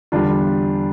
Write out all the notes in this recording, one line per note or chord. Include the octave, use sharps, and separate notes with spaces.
E2 D3 G3 D4 F4